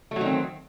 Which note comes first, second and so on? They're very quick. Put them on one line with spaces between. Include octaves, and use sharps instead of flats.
A3 F#3 D#3 C4